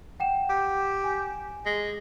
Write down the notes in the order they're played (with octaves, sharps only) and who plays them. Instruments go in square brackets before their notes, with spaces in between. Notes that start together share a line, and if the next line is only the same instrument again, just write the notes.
[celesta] F#5 G5 E7
[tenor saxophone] G4
[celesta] G#5
[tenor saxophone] G#3